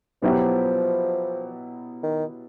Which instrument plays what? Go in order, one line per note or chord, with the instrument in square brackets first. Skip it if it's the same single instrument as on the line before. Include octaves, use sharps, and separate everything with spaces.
[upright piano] B2 F#3 B3 E4 G4 [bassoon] F3
[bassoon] D#3